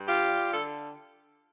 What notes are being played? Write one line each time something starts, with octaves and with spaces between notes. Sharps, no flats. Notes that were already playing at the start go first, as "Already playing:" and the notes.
Already playing: G2
F4 G4
G3
D3 A4